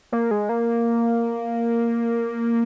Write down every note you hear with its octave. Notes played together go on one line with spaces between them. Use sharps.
A#3
G#3
A#3